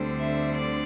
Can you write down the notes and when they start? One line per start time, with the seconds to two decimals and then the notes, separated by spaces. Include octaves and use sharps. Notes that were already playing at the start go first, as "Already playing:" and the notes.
Already playing: D2 D3 G3 C4
0.20 E5
0.53 D5